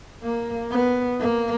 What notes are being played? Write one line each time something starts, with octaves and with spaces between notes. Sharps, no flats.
A#3
B3
A#3